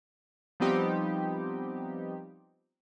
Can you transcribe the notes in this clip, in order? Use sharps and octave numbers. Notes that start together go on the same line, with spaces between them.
F3 G3 B3 C4 D#4 G4